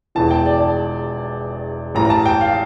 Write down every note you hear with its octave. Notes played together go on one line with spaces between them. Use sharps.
E1 E2 E3 A5
G5
D5
A5
A1 A2 E3 A#5
A#5
A5
G5
F5